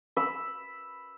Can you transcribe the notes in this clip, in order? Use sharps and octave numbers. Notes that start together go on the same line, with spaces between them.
B5 E6